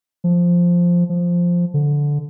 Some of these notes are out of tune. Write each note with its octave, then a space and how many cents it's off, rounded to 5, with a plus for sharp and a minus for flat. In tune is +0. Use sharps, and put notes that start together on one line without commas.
F3 +0
F3 +0
D3 -10